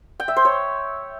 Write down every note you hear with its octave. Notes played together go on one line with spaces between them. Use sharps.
G5
E5
C5
C#5